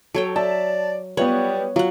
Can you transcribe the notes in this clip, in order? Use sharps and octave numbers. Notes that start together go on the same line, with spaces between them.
F#3 A4 C#5 G5
D5 E5 A5
G3 B3 F4 B4 C#5 F#5
F#3 F4 F#5